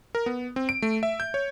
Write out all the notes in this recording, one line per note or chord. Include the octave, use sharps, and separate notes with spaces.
A#4
B3
C4
D7
A3
E5
G6
C#5